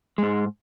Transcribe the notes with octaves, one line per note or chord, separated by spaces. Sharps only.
G#2 G#3